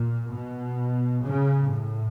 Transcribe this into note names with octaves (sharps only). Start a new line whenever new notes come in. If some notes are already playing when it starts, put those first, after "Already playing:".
Already playing: A#2
B2
C#3
A2